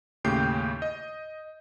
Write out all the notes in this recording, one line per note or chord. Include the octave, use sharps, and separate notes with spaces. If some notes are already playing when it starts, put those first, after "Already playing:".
D#2 A2 C#3 G4 G6 C7
D#5